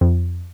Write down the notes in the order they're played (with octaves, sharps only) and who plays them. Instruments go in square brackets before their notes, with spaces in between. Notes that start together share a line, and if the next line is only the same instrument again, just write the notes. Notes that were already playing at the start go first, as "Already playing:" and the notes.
[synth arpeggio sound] F2